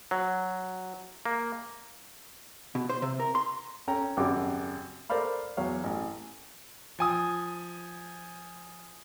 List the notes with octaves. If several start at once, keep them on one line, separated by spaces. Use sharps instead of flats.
F#3
A#3
B2
C5
C3
A#4
C6
C#4 A4 G5 A#5
G#1 F#2 C#3 G3 D6
A4 A#4 C5 D5 F5 B5
E2 F#3 C#5 F5
A1
F3 G#5 D#6